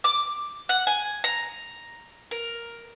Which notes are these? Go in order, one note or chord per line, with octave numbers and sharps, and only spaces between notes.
D6
F#5
G#5
A#5
A#4